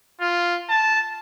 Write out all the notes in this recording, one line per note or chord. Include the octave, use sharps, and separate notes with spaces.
F4
A5